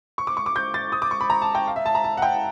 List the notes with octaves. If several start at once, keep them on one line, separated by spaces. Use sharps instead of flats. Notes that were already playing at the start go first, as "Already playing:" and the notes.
C#6
D6
C#6
D6
G6
A6
D#6
D6
C#6
B5
A#5
A5
G5
F5
E5
A5
A#5
A5
F#5
G5